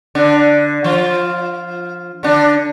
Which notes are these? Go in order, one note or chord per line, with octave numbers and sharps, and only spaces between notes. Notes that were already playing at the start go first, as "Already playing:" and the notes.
D3 D4
F3 F4
D3 D4